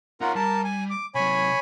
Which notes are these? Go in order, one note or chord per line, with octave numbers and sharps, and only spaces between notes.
D#4 F4 A#4 C#5 F#5
G3 A#4 A5
G#5
D6
C3 F#3 C#5 G#5 B5